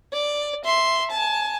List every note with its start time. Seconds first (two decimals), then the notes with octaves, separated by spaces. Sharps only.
0.13 D5
0.65 E5 C6
1.11 G#5 A5